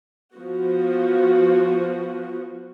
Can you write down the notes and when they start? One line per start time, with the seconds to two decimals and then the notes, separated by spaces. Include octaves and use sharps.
0.34 F3 B3 F#4